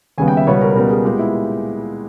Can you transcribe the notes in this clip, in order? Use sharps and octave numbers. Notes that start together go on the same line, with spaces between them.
D#2 C#3 G3 B3 G#5
G5
E5
C#2 B2 G3 B3 C#5
A#4
C#2 B2 G3 B3 A#4
G#4
A#2 G#3 B3 G4
E4